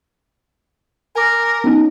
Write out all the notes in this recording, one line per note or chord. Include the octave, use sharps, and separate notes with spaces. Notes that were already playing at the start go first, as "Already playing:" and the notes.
A#4 G#5 D6
B3 C#4 D#4